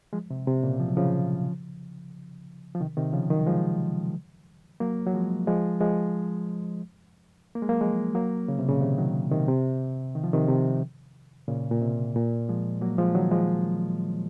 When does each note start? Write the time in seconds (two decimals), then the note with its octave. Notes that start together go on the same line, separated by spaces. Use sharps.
0.13 F3 G#3
0.30 C3
0.47 C3
0.63 A#2 C#3
0.80 F3
0.88 F#3
0.97 C#3 F3
2.75 F3
2.80 C3 D#3
2.97 C3 D#3
3.13 C#3 F3
3.30 D#3 F#3
3.46 F3 G#3
4.80 F#3 A#3
5.07 F#3
5.13 F3 G#3
5.47 F3 G#3
5.80 F3 G#3
7.55 A#3
7.62 G#3
7.69 F#3 A#3
7.81 F3 G#3
8.15 F#3 A#3
8.48 C#3
8.59 C3
8.68 A#2 C#3
8.81 C3 D#3
8.98 D#3 F#3
9.31 C3 D#3
9.48 C3
10.15 D#3
10.23 F3
10.33 C3 D#3
10.48 C3
11.48 A#2 C#3
11.71 A#2
11.81 C3
12.15 A#2
12.49 F3 G#3
12.81 F#3 A#3
12.98 F3 G#3
13.15 D#3 F#3
13.31 F3 G#3